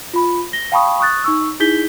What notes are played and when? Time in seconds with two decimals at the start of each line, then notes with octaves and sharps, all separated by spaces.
0.14 F4 B5
0.53 A#6 G7
0.72 F5 G5 A5 B5 C#6 D#6
1.00 C#6 D#6 F#6 A6
1.24 D#4 C#6 E6
1.60 D#4 E4 G#4 G6 B6 G7